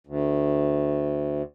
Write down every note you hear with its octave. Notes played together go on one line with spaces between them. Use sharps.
D2